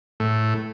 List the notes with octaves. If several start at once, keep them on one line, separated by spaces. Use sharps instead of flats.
A2